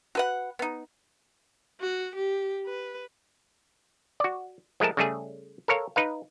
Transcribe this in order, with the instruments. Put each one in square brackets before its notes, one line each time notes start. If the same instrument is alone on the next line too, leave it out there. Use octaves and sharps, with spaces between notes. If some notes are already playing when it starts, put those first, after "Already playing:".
[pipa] F#4 B4 F#5
B3 D#4
[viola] F#4
G4
B4
[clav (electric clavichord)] F#4 D5
F3 G#3 A3 A#4 A5
C#3 G3 A3 G#4
A4 A#4 C#5 F5
D#4 B4 F5